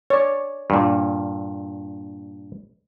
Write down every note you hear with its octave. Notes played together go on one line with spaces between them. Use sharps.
C#5 D5
G2 A#2